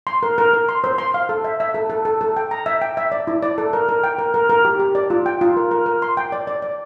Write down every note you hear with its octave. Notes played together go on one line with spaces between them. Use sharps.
C6
A#4
A#4
A#4
C6
C5
C6
F5
A4
E5
E5
A4
A4
A4
A4
G5
A#5
E5
G5
E5
D5
E4
D5
A4
A#4
A#4
G5
A#4
A#4
A#4
G4
G4
D5
F4
G5
F4
A#4
A#4
A#4
C6
G5
D5
D5
D5